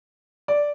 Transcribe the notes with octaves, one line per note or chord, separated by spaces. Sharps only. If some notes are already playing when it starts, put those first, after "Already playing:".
D5